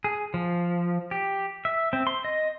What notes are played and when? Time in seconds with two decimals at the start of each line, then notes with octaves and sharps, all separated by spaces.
0.04 G#4
0.34 F3
1.11 G4
1.65 E5
1.93 C4
2.07 C6
2.25 D#5